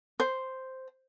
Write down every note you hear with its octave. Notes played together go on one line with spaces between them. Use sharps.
C5